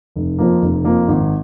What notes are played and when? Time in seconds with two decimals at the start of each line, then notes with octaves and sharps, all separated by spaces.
0.16 F1
0.38 F2 F3 A#3
0.62 F1
0.85 F2 F3 A#3
1.08 G#1